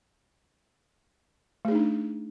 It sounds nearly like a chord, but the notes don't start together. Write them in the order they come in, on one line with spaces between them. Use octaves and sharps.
A3 G#4 D#4 D4